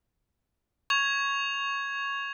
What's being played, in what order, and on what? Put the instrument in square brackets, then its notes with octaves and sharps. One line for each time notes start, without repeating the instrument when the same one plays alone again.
[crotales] C#6 G#6 F7